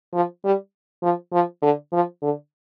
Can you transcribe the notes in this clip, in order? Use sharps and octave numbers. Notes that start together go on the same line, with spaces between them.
F3
G3
F3
F3
D3
F3
D3